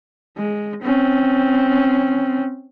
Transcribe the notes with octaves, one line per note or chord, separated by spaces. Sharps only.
G#3
C4 C#4